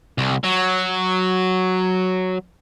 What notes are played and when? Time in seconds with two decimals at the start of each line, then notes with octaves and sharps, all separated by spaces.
0.18 C2
0.44 F#3